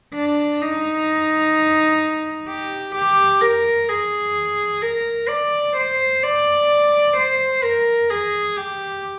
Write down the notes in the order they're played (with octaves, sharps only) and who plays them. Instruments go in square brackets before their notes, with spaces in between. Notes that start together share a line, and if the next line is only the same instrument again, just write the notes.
[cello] D4
D#4
G4
G4
A#4
G#4
A#4
D5
C5
D5
C5
A#4
G#4
G4